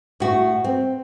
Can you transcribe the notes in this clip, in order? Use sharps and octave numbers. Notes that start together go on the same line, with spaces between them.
A2 F#4
C4